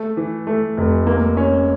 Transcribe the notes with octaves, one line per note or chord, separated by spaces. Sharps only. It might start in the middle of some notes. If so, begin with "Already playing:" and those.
Already playing: A3
E3
A3
F1
A#3
C#4